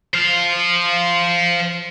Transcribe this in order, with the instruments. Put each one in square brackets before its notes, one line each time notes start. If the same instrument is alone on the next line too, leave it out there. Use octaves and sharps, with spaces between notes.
[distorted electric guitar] C5 F5